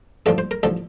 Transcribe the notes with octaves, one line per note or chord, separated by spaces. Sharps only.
A1 G2 D3 F3 A4
C5
A#4
A1 D3 F3 A4